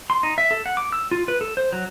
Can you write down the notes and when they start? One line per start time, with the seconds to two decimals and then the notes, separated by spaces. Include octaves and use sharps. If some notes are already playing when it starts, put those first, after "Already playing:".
0.10 C6
0.23 D#4
0.38 E5
0.51 A4
0.66 F#5
0.77 D6
0.92 E6
1.11 F4
1.28 B4
1.41 A4
1.57 C5
1.73 F#3